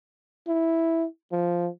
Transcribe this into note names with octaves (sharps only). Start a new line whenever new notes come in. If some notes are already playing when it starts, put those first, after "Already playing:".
E4
F3